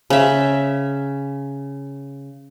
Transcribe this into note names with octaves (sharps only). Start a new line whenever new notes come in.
C#3 E5